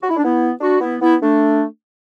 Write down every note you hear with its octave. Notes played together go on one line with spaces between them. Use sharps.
F#4
E4
D4
B3 E4
D4 F#4
B3 E4
B3 E4
A3 D4